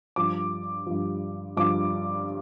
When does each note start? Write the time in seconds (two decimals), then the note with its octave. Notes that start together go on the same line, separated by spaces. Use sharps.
0.16 G2 F3 D6
0.86 G2 F3
1.57 G2 F3 D6